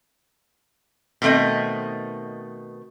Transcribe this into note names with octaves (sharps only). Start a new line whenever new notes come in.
B2 D#3 A3 C4 D#5